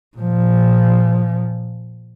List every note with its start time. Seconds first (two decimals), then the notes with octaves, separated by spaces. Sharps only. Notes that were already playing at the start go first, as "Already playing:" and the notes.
0.17 A#2 F3